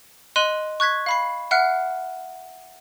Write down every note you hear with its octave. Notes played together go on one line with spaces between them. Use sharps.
D#5 C6 F#6 D#7 F#7
C#6 F#6 G#6 B6
F5 B5 C7
E5 F#5 F6 F#6 C7 C#7